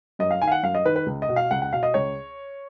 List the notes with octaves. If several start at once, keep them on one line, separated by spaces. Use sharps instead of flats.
F#2 D#5
F5
D#3 G#5
F5
F#5
F#2 F5
D#5
D#3 B4
B4
C#2
D#5
B2
F5
C#2 F#5
F#5
B2 F5
D#5
C#2 C#5